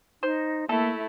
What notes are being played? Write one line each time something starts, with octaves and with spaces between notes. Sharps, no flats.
D#4 C5
A3 A#3 E4 A4 E5